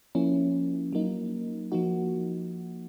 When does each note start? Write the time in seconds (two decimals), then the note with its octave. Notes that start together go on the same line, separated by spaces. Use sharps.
0.15 F3 A#3 C#4 E4
0.93 F#3 A#3 D#4
1.72 F3 A#3 D#4 F#4